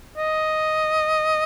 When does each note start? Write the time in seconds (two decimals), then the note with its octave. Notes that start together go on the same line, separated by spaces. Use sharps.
0.17 D#5